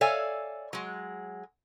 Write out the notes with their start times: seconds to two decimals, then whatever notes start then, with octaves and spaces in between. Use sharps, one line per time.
0.01 A4 C#5 D5 E5 F5 G#5
0.73 F#3 G#3